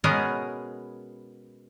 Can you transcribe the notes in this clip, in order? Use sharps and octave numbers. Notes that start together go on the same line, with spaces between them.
B2 G#3 B3 C#4 G#4 A#4